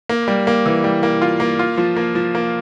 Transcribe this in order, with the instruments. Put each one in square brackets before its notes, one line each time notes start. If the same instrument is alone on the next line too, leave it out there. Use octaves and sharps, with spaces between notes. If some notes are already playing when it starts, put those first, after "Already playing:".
[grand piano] A#3
G3
A#3
E3
G3
A#3
F4
A#3
F4
F3
A#3
F3
A#3